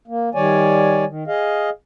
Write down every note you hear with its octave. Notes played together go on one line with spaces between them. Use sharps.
A#3
D#3 G3 C#5 D5 G#5
D#3
G#4 D#5 F5